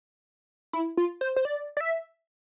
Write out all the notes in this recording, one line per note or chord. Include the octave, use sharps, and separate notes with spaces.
E4
F4
C5
C5
D5
D5
E5